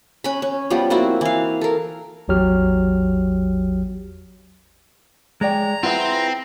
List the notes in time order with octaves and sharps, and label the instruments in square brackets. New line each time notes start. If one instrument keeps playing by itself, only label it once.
[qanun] C#4 B5
C#4
F3 G3 B3
A#3 C4 E4 F#4
E3 F5
A4 A#4
[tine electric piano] A1 E2 F#3 G4 F6
[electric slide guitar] G#3 [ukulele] C#5 D5 G5 [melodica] A#5
[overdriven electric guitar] C4 [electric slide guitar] E4 F4 B4 [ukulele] G#4 E5 F#5